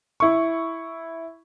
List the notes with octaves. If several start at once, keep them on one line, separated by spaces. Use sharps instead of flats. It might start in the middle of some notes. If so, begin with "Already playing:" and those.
E4 C#6